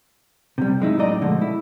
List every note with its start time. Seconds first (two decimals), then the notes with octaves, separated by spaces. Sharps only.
0.58 C3 G3
0.80 F#2 G#3 D#4 E4
0.99 F#2 A2 D5 D#5 A#5
1.22 B2 D3 F3 G#3 A3
1.42 E4